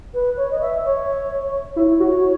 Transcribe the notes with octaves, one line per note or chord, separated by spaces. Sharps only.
B4
C#5
D#5
E5
C#5
E4 C#5
F#4